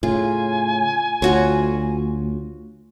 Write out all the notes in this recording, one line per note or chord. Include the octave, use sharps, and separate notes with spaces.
A2 C#3 F4 G#5
D2 F4 F#4 C#5